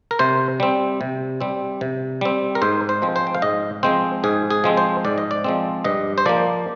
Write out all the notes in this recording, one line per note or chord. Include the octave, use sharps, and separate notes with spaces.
A#4
C3 C5
G3 C4
C3
G3 C4
C3
G3 C4
A#4
G#2 C5
C5
F3 G#3 C4
C5
G5
F5
G#2 D#5
F3 G#3 C4 C5
G#2 G#4
G#4
F3 G#3 C4
C5
G#2 D5
D#5
D5
F3 G#3 C4
G2 D#5
C5
F3 A#3 D5